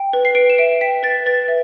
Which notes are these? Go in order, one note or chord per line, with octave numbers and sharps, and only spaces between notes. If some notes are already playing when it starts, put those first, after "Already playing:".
Already playing: G5
B4
C7
B4 D7
E7
E5 D7
G5 B6
B4 A6
B4 A6
E5